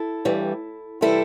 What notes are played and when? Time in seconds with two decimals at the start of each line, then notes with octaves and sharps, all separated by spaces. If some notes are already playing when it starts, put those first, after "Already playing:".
Already playing: E4 A4
0.25 G2 E3 G3
1.01 C3 E3 G3 E4 A4